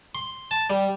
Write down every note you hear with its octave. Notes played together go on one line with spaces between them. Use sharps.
C6
A5
G3